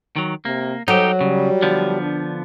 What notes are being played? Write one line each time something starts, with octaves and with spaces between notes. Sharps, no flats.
D#3 F#3
C3 A#3
F#3 D#4 G4 A4
C#3 G3
D3 F3 B3
D4